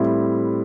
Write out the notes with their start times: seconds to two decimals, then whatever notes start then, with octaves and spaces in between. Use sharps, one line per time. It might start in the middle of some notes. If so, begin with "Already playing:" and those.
Already playing: A2 G3 C4 E4